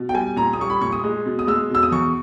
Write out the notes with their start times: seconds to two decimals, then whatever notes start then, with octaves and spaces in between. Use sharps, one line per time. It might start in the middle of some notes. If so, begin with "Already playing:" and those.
Already playing: B2
0.09 G5
0.14 G3 G#5
0.36 A#2 A#5
0.53 D#6
0.59 G3 C#6
0.70 B5
0.81 A#2 C#6
0.92 D#6
1.04 G#3
1.26 B2
1.39 D#6
1.47 G#3 E6
1.70 B2 E6
1.83 D#6
1.92 E2 C#6